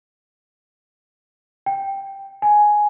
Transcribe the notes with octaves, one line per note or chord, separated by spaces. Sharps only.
G5
G#5